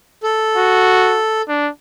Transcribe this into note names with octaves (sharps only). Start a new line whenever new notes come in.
A4
F#4
D4